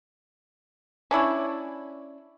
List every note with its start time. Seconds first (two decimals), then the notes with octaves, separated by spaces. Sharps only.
1.11 C#4 D4 E4 C#5